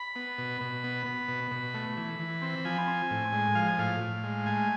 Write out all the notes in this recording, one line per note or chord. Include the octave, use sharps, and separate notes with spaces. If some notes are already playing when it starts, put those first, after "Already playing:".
Already playing: B5
B3
B2
B2
B3
B3
B2
B2
A3
E3
E3
C4
F3 G#5
C4
A2
G#3
F3 F5
G#5
A2 F5
A2
G#3
A3 G#5